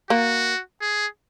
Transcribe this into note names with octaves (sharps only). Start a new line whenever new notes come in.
A#3 F#4
G#4